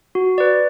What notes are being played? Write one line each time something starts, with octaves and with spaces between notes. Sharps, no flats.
F#4
B4 D5